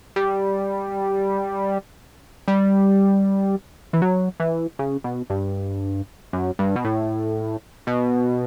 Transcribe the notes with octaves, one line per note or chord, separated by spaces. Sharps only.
G3
G3
E3
F#3
E3
C#3
B2
G2
F#2
G2
B2
A2
B2